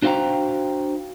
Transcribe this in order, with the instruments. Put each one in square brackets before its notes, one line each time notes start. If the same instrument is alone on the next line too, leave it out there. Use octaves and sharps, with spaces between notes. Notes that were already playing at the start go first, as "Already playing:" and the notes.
[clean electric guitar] D4 F#4 C5 F5 G5 A#5